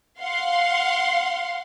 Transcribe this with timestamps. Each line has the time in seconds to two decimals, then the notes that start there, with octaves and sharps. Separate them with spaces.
0.20 F5 F#5 C6